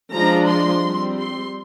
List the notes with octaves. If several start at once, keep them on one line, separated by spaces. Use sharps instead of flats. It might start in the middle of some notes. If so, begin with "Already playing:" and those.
F3 G#3 D4 A#5
C6
G3 C4
C6